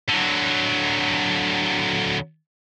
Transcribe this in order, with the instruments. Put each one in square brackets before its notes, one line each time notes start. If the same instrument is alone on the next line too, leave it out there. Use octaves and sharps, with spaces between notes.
[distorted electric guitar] D3 F#3